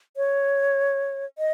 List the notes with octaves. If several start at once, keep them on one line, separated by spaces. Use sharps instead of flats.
C#5
D#5